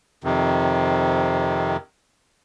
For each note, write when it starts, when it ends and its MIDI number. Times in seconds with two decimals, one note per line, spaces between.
0.24 1.77 41
0.24 1.77 48
0.24 1.77 51